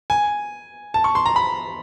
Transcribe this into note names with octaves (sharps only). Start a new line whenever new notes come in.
G#5
A5
C#6
C6
A#5
B5